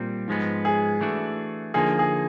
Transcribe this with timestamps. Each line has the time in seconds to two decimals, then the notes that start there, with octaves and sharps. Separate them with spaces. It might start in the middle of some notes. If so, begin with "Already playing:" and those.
Already playing: A#2 G3 C4
0.28 G#2 F3 G#3 B3
0.65 G#4
1.00 E3 A3 D4 F#4
1.74 D3 F3 A#3 D#4 G#4
1.99 G#4